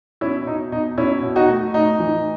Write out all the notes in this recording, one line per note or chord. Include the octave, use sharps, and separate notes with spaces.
B2 C#4 E4
B2 D#4
B2 D#4
B2 C#4 E4
B2
D#4 F#4
A3
A2 D#4
E3